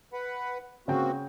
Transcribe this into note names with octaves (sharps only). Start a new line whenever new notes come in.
B4 F#5 B5
C#3 A#3 C4 F#4 G5